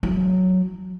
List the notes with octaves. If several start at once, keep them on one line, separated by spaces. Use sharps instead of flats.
F#3